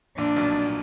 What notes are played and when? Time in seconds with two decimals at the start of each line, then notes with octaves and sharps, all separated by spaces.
0.17 A#1 A#2 D4
0.36 B1 B2
0.67 A#2